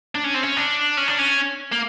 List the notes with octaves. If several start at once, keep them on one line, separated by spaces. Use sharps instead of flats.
D4
C#4
C4
C#4
D4
C#4
D4
C#4
A#3